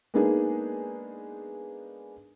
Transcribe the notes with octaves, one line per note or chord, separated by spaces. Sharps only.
G#3 A#3 B3 D4 D#4 G#4